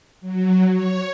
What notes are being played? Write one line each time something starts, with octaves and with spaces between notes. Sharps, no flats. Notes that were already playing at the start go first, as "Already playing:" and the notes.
F#3
C#5